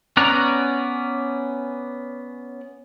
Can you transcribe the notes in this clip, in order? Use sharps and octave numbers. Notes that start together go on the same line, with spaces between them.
B3 C#4 D5 A#5 F#6